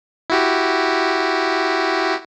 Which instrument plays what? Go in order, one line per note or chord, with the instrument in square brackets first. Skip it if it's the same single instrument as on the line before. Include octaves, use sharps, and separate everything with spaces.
[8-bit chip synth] E4 F#4 G4